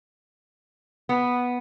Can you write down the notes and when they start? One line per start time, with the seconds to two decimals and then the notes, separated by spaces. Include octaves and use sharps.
1.09 B3